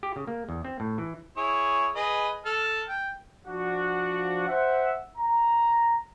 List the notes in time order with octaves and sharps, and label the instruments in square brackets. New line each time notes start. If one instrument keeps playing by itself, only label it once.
[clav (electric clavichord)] G4
C#3
A#3
E2
C4
A2
E3
[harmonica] E4 G#4 C#5
G#4 B4 D#5
A4 A5 F6
G5
[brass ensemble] F3 D4 F#4 F#5
C5 E5 F#5
A#5